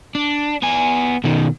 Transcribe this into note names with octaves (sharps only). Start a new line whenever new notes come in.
D4
B3 G#5
B2 D#3